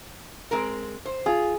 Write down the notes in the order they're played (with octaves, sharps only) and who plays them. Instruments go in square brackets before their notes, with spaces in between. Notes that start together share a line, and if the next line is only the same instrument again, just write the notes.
[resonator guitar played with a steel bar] G#3 C4 A#4
C5
[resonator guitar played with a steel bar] F4 [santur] G#4